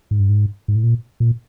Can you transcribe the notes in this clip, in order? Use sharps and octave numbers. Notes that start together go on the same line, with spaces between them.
G#2
G2
G#2
G#2
A2
A#2
A#2